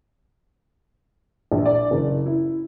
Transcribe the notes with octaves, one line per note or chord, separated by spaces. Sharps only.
A#1
D5
F#1
E4